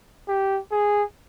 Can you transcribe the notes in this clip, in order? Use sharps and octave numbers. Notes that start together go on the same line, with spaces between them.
G4
G#4